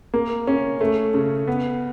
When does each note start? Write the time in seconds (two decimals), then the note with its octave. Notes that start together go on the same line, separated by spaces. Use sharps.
0.14 A#3
0.47 C#4
0.81 A3
1.14 C#3
1.47 B3